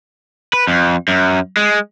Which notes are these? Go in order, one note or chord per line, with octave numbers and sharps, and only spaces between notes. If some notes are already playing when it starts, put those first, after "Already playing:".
B4
F2
F#2
G#3